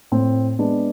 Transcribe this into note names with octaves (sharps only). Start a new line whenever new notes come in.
A2 C4
G#3 B3 D4